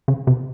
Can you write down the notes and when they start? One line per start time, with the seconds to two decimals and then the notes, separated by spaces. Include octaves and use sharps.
0.08 C#3
0.27 C3